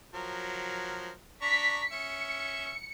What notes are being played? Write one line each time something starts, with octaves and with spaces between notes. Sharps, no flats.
F3 F#3 A#4
D4 A#5 C#6 B6
C#4 E5 C#7